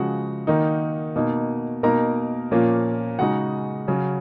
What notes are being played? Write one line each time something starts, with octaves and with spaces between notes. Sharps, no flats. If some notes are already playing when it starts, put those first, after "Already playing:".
Already playing: C#3 F3 G#3 F#4 F#5
D#3 A#3 D#4
B2 A#3 D#4
B2 A#3 D#4 A#4 A#5
A#2 F3 A#3 C#4
C#3 G#3 D#4 F#4 F#5
C#3 F#3 C#4